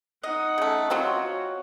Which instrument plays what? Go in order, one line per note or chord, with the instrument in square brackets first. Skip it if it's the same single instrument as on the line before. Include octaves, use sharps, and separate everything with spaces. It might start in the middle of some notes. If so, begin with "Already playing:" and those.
[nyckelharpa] D#4 F#5 [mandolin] D#5
[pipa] C#3 A3
[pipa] F#3 C4 F4 [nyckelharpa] F#4 C#5